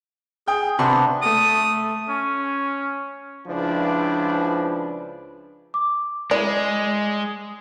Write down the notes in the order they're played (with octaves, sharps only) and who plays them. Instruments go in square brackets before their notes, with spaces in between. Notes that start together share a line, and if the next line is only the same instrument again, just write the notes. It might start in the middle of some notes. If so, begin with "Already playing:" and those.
[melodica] G#4 [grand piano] G5 G6
[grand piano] C3 F#5 C6 [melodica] B3 D4
[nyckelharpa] A3 [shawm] D#6
[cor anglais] C#4
[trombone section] C#2 F3 D4 E4 B4
[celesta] D6
[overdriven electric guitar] G#3 [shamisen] E4 D5